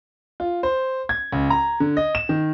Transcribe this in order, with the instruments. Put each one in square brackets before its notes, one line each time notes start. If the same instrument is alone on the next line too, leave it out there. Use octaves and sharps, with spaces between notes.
[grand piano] F4
C5
G#6
C#2
A#5
D3
D#5
E7
D#3